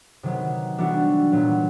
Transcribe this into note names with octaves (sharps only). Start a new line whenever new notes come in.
C3 D#3 F#3 B3
E3 G3 B3 D4 F#4
A#2 F#3 B3